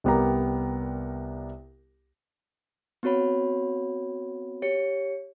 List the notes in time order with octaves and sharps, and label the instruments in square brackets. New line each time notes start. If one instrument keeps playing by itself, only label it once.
[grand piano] C2 G3 B3 G4 A#4 A#5
[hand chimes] B3 C4 F#4 C#5 B5
G4 C#5 C#7